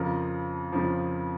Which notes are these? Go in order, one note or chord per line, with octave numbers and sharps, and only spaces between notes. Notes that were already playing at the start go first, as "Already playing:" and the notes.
Already playing: F2 C#3 F3 A#4
F2 C#3 F3